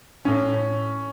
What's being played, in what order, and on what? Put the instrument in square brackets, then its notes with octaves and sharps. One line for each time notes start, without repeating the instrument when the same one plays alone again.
[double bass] A2 [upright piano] C#4